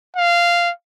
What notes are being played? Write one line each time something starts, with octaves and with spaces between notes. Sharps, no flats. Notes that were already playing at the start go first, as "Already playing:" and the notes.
F5